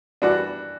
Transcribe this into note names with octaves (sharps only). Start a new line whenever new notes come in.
E3 G3 D4 F#4